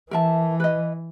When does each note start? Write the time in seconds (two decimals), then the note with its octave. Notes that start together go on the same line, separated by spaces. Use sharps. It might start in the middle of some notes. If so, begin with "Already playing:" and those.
0.11 E3 A#4 E5 A5
0.60 B4 D#5